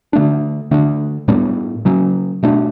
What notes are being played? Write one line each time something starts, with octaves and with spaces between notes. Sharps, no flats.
D3 A3 D4
D3 A3 D4
A2 G3 B3 D4
C#3 F#3 C#4
B2 A3 D4